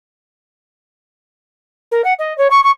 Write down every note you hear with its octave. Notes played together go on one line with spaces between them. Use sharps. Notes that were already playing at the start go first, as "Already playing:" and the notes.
A#4
F#5
D#5
C#5
C#6
C#6